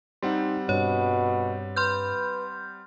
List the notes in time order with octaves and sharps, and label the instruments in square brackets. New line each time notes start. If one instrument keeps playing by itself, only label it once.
[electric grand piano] G3 C4 F#5 [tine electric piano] D#4 C6
[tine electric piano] G2 [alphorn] B2 [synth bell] C#5
[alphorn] B4 [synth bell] C6 F6 G6